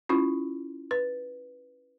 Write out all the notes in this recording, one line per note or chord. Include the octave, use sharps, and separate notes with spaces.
C#4 E4 F4
B4